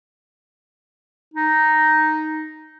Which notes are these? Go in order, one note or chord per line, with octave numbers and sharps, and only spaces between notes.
D#4